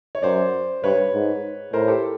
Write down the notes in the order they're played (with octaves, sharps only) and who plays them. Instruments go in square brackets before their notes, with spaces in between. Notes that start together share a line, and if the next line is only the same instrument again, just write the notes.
[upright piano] C#5
[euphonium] F#2 [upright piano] C5 D5
[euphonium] G2 [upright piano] B4 C#5
[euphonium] G#2
[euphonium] A2 [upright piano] A#4 C5
[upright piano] G4 A4